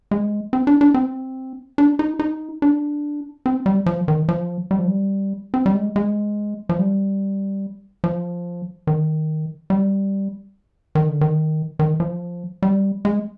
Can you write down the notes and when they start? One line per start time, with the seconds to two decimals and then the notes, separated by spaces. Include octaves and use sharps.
0.11 G#3
0.53 C4
0.67 D4
0.81 D4
0.94 C4
1.78 D4
1.99 D#4
2.19 D#4
2.62 D4
3.46 C4
3.66 G3
3.86 F3
4.08 D#3
4.29 F3
4.71 G3
4.79 F3
4.88 G3
5.54 C4
5.66 G3
5.75 G#3
5.96 G#3
6.69 F3
6.79 G3
8.04 F3
8.87 D#3
9.70 G3
10.95 D#3
11.09 D3
11.21 D#3
11.79 D#3
12.00 F3
12.63 G3
13.05 G#3